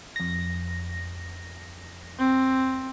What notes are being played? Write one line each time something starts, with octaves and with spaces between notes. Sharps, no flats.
F2 A#6
C4